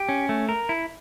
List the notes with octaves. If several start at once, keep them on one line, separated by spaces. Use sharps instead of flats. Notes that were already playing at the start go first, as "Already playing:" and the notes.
Already playing: G4
C#4
A3
A#4
E4